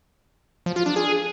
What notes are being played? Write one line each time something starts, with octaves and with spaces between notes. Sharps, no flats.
F3
F4
D4
G#4